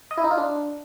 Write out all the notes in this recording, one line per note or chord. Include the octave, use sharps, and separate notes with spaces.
D#5
E4
D#4
F4
D4